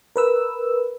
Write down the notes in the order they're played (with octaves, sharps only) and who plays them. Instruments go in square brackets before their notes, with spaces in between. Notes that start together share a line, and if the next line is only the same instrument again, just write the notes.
[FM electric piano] A#4 B4 E6